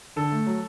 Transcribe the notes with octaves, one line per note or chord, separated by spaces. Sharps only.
D3 A4
A3
F#3